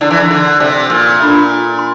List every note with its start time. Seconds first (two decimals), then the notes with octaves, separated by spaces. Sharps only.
0.01 D3 E4 A#4 D5 A5
0.11 E3
0.20 D3
0.31 D3
0.60 C3 A4 D5 G5
0.90 A#2
1.20 D4 F4 A4 E5
1.79 C6